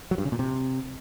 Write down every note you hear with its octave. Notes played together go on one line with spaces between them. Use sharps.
F#3
G2
C#3
A#2
C3